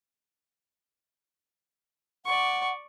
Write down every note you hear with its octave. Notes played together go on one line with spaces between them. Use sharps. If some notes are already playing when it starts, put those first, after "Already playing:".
D5 F#5 C#6